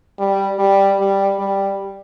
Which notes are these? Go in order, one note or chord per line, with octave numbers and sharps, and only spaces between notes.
G3
G3
G3
G3